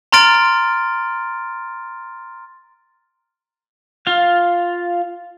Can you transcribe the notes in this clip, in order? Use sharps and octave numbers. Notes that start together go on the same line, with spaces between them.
A#5 C6 F6 A6 D7
F4 F5